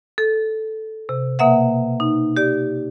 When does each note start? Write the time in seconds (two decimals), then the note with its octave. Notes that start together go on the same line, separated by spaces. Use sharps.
0.18 A4
1.09 C3
1.39 B2 A#3 E5 F#5
2.00 D#4
2.37 G4 D5